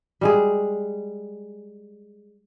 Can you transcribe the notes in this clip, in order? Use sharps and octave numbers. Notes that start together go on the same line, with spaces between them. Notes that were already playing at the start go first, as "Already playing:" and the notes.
G3 G#3 G#4